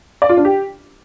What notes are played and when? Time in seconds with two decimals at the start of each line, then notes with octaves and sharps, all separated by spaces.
0.22 D5
0.29 F4
0.37 D4
0.45 G4